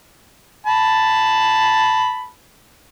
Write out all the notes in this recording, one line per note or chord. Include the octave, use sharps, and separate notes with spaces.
A5 B5